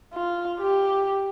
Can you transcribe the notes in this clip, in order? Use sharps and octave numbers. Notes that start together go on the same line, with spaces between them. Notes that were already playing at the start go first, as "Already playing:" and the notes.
F4
G4